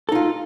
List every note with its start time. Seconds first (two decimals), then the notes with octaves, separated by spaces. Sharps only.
0.09 A4
0.12 D#4
0.15 F4